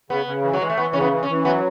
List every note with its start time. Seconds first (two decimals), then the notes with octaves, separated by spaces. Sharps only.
0.10 C#3 B3
0.26 C#3
0.44 E3
0.54 F#3
0.61 E3 G#3
0.70 A3
0.77 E3 B3
0.93 C#3 C#4
1.01 B3
1.11 E3
1.23 C#4
1.28 E3
1.45 F#3 B3